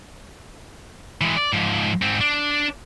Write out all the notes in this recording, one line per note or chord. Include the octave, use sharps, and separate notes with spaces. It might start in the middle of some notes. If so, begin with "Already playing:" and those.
E3 G#3
D5
G#2 F3
G#2 C4
D4